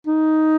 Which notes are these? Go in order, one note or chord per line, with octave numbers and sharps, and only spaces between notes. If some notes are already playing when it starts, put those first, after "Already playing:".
D#4